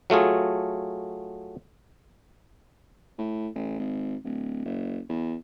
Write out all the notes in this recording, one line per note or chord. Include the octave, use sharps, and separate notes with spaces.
F#3 A3 F4 G#4
A2
A1
G#1
D1
F#1
E2